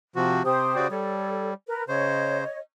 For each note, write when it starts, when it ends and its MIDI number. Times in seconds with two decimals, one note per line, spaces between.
0.16 0.43 48
0.16 0.43 53
0.16 0.43 66
0.44 0.75 48
0.44 0.87 67
0.44 0.87 72
0.44 0.87 87
0.76 0.88 49
0.76 0.88 66
0.76 0.88 74
0.90 1.54 55
0.90 1.52 69
0.90 1.52 73
1.67 1.83 70
1.67 1.83 71
1.88 2.44 49
1.88 2.44 72
1.88 2.60 73
1.88 2.60 75